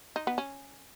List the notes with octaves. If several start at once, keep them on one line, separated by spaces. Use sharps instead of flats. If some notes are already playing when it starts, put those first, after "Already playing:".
D#4
B3
C#4